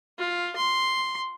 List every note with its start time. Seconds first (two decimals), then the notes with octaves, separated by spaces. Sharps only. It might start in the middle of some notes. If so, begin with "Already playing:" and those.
0.18 F4
0.56 C6